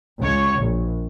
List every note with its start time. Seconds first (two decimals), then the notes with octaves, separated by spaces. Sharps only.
0.19 C#2 C#5
0.60 A#1